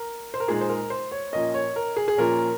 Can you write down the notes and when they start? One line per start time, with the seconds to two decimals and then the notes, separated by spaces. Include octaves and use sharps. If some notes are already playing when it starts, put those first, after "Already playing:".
Already playing: A#4
0.34 C5
0.40 A#4
0.48 A#2 G#3 D#4 G#4
0.61 C5
0.69 A#4
0.90 C5
1.11 C#5
1.33 A#2 F3 A#3 C#4 D#5
1.54 C#5
1.76 A#4
1.96 G#4
2.08 G#4
2.17 A#2 F3 A#3 C#4 A#4